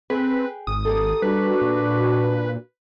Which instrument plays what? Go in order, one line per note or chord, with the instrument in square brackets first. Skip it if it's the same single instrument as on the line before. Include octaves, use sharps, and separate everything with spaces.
[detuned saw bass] C4 [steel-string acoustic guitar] G#4 G5 [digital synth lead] B4
[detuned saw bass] G#1 [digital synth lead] D#6
[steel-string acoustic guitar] A#3 G4 A4
[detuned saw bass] G3 [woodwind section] D4 F#4 [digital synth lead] B4
[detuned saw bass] A#2